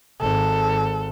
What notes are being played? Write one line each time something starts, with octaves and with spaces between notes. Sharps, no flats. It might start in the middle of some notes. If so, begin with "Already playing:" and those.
G#1 A4